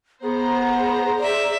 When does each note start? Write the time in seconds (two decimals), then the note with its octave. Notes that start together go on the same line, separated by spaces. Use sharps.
0.23 B3 G#4 C5 A#5
1.20 D5 E5